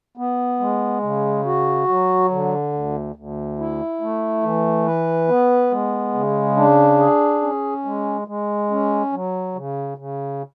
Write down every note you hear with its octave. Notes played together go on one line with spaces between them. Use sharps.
B3
G#3
C#3
F#4
F#3
D3
D2
D2
E4
A3
E3
B4
B3
G#3
C#3
D4
G#4
C#4
G#3
G#3
C#4
F#3
C#3
C#3